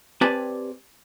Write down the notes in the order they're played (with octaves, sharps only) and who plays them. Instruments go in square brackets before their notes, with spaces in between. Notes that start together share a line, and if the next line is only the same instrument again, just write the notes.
[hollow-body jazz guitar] C4 G4 B4 D5 G#5 A5